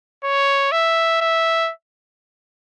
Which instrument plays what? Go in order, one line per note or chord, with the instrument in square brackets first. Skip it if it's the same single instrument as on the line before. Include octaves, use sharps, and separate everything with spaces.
[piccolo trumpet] C#5
E5
E5